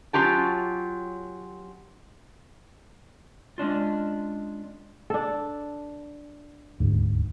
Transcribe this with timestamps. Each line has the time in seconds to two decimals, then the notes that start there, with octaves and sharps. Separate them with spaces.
0.13 F#3 C#4 F4 G4 A5
3.58 G#3 C#4 D4 F4
5.10 D4 A4
6.80 D#1 D2 G#2